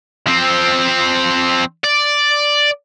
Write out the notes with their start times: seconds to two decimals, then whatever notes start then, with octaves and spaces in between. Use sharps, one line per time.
0.27 F3 C4
1.84 D5